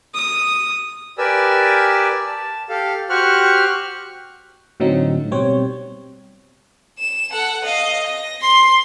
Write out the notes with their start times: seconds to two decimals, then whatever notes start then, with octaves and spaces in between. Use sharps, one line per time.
0.14 D#6
1.18 G4 A#4 B4 D5 G#5 E6
2.26 A5
2.69 G4 A4 F5
3.09 F#4 G4 C5 C#6 F6 F#6
4.80 A2 D3 F#3 A3 C4 D#4
5.31 B2 G3 C4 C5 C#5
6.99 E7
7.32 A4 F#5
7.64 D#5 F5
8.06 A#6
8.42 C6 C7